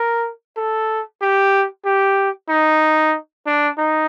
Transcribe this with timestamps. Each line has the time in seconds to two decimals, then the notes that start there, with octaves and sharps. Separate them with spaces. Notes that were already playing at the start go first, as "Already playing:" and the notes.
Already playing: A#4
0.57 A4
1.22 G4
1.85 G4
2.49 D#4
3.46 D4
3.78 D#4